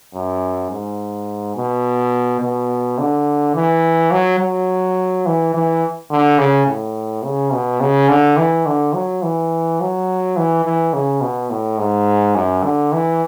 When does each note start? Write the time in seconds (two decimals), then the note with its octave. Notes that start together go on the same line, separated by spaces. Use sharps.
0.15 F#2
0.71 G#2
1.55 B2
2.41 B2
2.99 D3
3.55 E3
4.11 F#3
4.40 F#3
5.26 E3
5.54 E3
6.10 D3
6.39 C#3
6.67 A2
7.24 C#3
7.52 B2
7.80 C#3
8.09 D3
8.37 E3
8.66 D3
8.94 F#3
9.23 E3
9.80 F#3
10.37 E3
10.65 E3
10.94 C#3
11.21 B2
11.50 A2
11.78 G#2
12.35 F#2
12.63 D3
12.92 E3